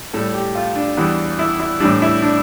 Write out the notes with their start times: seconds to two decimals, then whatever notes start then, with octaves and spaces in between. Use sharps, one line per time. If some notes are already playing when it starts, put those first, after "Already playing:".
0.14 A2 G3 A4
0.34 G4
0.55 F4
0.76 D4
0.97 E2 E3 G3
1.39 E4
1.60 E4
1.80 A2 E3 G3 D4
2.02 E4
2.22 D4